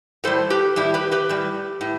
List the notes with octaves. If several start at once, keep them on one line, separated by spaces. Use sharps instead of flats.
A2 G3 A4 C5
G4 B4
A2 G3 E4 G4
G4 B4
G4 B4
A2 G3
A2